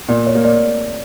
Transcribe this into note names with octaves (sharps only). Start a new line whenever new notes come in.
A#2 D5
C#5
A#3
D5